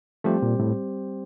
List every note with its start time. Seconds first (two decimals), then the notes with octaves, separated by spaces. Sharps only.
0.24 F3 G3 A3 C4 G4 C5
0.42 A#2
0.60 A2